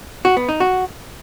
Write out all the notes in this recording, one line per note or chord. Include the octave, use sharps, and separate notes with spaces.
F#4
B3
D#4
F#4